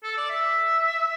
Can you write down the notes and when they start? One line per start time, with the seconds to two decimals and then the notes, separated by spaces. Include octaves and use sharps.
0.03 A4
0.17 D5
0.29 E5